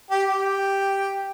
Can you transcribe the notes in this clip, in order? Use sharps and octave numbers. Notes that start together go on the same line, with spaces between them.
G4
G4